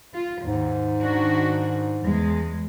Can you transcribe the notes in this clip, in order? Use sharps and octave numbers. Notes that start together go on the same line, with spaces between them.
F4
D#2 G#2
D#3 D4 F#4
E2 G#3